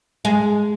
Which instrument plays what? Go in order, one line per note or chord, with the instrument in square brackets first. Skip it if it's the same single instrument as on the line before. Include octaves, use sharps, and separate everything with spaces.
[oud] G#3